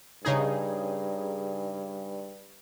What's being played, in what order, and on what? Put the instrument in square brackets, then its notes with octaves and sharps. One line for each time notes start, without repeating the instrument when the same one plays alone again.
[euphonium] G2 [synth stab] C#3 D#4 G#4